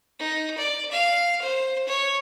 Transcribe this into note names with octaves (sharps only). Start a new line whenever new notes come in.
D#4
D5
F5
C5
C#5